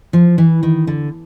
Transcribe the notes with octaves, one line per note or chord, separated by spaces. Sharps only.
F3
E3
D#3
D3